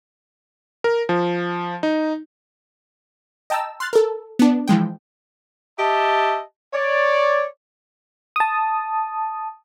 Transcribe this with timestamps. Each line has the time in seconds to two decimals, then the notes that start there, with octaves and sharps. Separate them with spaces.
0.84 A#4
1.09 F3
1.83 D#4
3.50 D#5 G5 A5 A#5 E6
3.80 C6 F6 F#6 A6
3.93 A4 A#4
4.39 B3 D4
4.68 E3 F3 G#3 G5
5.79 G4 D#5 E5 A5
6.73 C#5 D5
8.36 A5 D#6